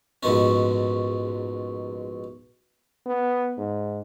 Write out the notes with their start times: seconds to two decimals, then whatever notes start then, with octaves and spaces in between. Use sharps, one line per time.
0.23 A#1 G#2 B2 C#4
3.06 B3
3.58 G#2